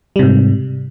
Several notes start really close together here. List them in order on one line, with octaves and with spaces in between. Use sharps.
G3 C3 G#2